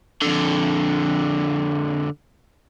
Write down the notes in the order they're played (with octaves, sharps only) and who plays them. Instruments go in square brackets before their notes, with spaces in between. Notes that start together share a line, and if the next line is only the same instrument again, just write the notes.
[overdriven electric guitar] F2 D3